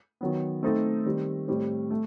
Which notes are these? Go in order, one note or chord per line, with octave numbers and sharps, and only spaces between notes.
D#3 F#3 B3
A3 C4 D#4 A4
D#3 G3 C4
A2 G3 C4
A3